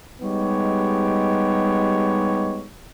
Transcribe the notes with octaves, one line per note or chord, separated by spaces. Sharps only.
G3 G#3 B3 D#4 G4 C#5